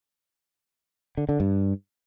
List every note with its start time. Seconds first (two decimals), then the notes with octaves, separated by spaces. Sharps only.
1.17 D3
1.29 D3
1.40 G2